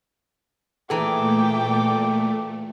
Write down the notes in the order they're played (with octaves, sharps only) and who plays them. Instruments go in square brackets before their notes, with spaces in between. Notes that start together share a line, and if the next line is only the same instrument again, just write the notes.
[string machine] A#2 A3 [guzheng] E3 G#4 [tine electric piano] A4 A#5 [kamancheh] G5 D6